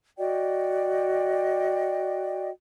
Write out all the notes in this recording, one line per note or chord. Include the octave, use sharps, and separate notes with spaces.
F#4 D5 D#5 G5